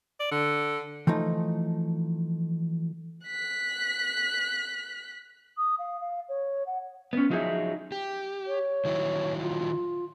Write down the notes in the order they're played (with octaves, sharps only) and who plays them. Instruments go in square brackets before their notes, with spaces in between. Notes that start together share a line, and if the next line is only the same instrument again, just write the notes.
[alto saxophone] D5
D3
[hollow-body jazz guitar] E3 F3 A3 D#4
[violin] F#6 B6
[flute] D#6
F5
F5
C#5
F#5
[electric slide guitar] B3 C#4
F3 F#3 D#4 F#4 G#4 E5
G4
[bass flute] C#5
[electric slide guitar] D#3 F#3 E4
[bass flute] F4